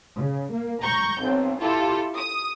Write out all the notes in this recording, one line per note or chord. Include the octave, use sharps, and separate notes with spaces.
C#3
A#3
A#5 C#6 G6
B1 C4
E4 F4 G4 A4
D#6